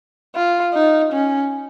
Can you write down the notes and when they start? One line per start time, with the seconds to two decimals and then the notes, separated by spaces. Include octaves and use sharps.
0.35 F4
0.75 D#4
1.13 C#4